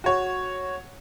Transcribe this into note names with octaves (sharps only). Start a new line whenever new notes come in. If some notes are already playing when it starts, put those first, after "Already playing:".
F#4 C#5